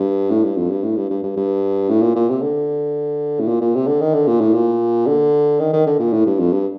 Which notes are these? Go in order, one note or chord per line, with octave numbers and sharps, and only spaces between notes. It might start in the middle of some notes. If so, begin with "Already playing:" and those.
Already playing: G2
A2
G2
F2
G2
A2
G2
G2
G2
G2
A2
A#2
A#2
C3
D3
A2
A#2
A#2
C3
D3
D#3
D3
A#2
A2
A#2
D3
D#3
D#3
D3
A#2
A2
G2
F2
G2